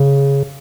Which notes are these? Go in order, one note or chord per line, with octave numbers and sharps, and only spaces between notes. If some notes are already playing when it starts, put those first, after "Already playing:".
Already playing: C#3